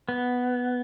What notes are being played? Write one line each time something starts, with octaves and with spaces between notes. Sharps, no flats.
B3